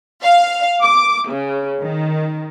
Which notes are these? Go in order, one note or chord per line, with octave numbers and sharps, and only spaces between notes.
F5
D6
C#3
D#3